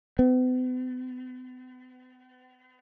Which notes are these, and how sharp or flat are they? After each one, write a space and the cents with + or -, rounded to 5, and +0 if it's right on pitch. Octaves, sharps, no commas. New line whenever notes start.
B3 +45